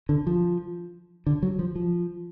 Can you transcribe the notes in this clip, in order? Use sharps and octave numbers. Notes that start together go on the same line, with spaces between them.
D3
F3
D3
F#3
F3
F3